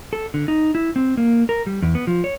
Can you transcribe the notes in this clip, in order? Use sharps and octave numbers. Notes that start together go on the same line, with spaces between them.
A4
D3
D#4
E4
C4
A#3
A#4
G3
E2
B3
F3
C#5